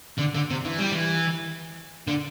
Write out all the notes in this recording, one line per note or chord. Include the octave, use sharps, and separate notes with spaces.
D3
D3
C3
E3
G3
E3
D3